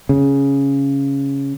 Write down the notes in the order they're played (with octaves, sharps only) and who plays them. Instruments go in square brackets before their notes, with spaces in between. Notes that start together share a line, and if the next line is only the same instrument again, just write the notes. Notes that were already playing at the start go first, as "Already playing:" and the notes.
[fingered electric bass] C#3